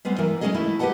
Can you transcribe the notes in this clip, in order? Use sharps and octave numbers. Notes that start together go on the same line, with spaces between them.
G3 G#3 B3 C4
E3 A#4
G#3 C4 C#4 G#4 D#5
A3 E4
G4 B4 C#5 D#5 F#5 A5